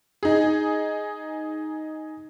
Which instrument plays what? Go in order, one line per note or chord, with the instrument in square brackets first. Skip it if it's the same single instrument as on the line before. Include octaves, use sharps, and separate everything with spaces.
[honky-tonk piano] D#4 G#4